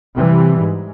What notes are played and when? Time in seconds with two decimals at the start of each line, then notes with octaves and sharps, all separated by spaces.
0.16 C3 E3 G3
0.58 G#2